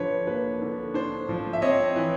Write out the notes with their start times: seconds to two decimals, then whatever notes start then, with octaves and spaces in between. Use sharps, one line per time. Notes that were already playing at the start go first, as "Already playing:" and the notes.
Already playing: D3 F3 D4 B4 C#5
0.27 A#3 B4
0.61 D3
0.94 D4 C5
1.29 F3
1.53 E5
1.62 C4 C#5 D#5
1.96 E3